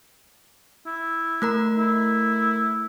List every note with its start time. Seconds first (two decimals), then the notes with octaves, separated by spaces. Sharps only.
0.86 E4
1.42 A3 A#4 A#5
1.78 E4